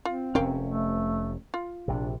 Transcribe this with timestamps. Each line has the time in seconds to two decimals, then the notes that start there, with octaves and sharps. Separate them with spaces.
0.05 C4 F4
0.35 F1 C3 C#4 A#4 F5 G5
0.64 A3
1.54 F4
1.88 A#1 C3 D4